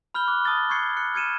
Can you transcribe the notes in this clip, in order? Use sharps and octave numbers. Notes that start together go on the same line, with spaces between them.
B5 F6 G6 G7
D6 F#6
A5 D#6 F6 F#6 A6 G7
C#6 F#6 G#6 C7 C#7
F#6 C#7
F6 G#6 C#7 D#7 E7